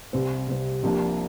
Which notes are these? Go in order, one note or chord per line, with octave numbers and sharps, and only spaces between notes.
C2 C3 G3 C4
C2 C3 G3 C4
C2 C3 F3 A#3 D4